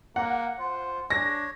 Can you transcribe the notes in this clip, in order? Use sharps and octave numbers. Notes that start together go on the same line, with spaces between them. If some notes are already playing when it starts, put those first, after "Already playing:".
A#3 F#5
F4 C5
D4 C#5 A#6